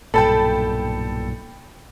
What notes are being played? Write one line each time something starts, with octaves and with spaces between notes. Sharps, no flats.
B1 G2 A#2 A4 G5 A5 B5